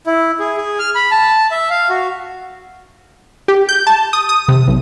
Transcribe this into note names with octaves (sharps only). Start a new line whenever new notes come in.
E4
G#4
G#4
F6
B5
A5
E5
F5
F#4
G4
G6
A5
D#6
D#6
C3
B1